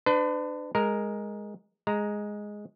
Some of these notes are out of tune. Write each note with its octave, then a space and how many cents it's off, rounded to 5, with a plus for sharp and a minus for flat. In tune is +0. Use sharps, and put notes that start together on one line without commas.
D4 +25 B4 +45
G#3 -5 A#4 +0
G#3 +0 A#5 +0